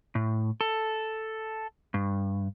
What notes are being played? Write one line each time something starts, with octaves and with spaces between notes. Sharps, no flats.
A2
A4
G2